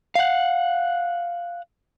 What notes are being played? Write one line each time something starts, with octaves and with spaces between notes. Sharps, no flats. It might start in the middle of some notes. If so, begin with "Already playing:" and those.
F5 F#5